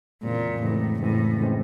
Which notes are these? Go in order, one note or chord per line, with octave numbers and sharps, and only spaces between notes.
F2 A#2 C#3 E3 G#3 C4
F2 A2 C#3 E3 G#3 C4
F2 A2 C#3 E3 G#3 C4
C#3 E3 G#3 C4